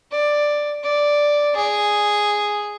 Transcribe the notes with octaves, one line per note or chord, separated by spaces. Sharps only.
D5
D5
G#4